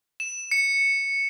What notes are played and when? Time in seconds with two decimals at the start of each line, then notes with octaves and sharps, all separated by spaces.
0.20 E7
0.51 C#7